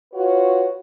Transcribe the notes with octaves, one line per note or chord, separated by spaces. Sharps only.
F4 F#4 B4 C#5